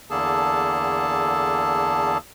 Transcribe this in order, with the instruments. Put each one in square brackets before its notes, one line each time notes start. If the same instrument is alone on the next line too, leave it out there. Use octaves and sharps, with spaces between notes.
[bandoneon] E2 D3 A#3 G#4 A4 A5